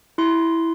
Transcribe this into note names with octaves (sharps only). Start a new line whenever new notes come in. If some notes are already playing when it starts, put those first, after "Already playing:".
E4 C6